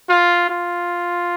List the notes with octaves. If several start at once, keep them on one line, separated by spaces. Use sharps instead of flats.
F4
F4